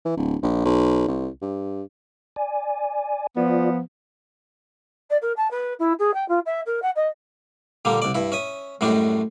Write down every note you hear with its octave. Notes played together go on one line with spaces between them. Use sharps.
E3
D1
A#1
B1
C2
G2
D5 G#5
F3 B3 F4 D5
D5
A#4
A5
B4
E4
G#4
G5
F4
E5
A#4
F#5
D#5
A#2 D3 G3 A#3
C2 D5
G2 E4
C#4 E5 D#6
F#2 A2 G3 G#3 D4